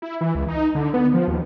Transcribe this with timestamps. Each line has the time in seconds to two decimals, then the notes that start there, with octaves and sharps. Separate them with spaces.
0.02 E4
0.21 E3
0.35 C#2
0.48 D#4
0.75 D3
0.94 B3
1.14 F3
1.28 D#2